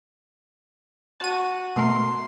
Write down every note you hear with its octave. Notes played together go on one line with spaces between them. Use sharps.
F#4 A5 D#7
B2 A3 A#4 C6